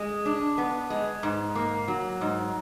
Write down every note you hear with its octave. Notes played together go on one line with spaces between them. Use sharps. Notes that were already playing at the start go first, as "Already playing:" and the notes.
Already playing: G#3
D4
B3
G#3
G#2
A#3
F#3
G#2